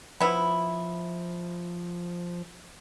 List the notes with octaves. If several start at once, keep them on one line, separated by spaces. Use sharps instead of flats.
F3 B3 E4